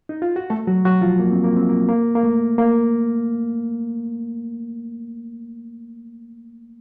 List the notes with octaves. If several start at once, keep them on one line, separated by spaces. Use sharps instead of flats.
D#4
F4
F#4
A3 A4
F#3 F#4
F#3 F#4
F3 F4
A#3
C4
A#3
C4
A#3
A#3
A#3
A3
A#3